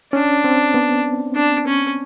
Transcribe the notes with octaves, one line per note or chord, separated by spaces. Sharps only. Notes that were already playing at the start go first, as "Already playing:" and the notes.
C#4 D4
C4
B3
D4
C#4